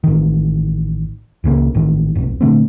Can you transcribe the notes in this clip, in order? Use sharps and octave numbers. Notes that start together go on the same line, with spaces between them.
A1 D#3
F1 C#2 C#3 A#3
A1 D#3
F1 B1
A#2 D3 A3 C4